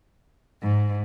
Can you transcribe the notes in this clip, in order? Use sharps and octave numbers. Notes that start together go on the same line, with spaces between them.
G#2